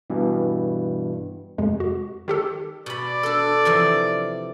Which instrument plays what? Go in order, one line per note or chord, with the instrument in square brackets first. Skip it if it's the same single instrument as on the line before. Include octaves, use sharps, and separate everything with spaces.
[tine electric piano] G2 B2 E3
[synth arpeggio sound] F2 C3 G#3
F#4
D#3 G4 A4
[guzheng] B2 B5 [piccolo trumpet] D5
[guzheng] D4 A4
C3 E3 F3